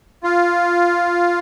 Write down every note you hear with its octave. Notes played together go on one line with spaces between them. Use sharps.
F4